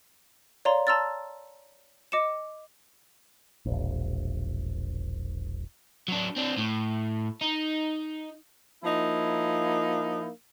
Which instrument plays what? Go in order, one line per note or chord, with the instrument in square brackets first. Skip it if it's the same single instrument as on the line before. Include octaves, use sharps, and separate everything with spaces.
[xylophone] C#5 D5 F5 A#5 C6
A5 A#5 C6 E6 F6 A6
D#5 D6 C#7 E7
[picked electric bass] E1 A#1
[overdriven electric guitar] F#3 D4
C4 D4
A2
D#4
[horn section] F3 A#3 D#4 E4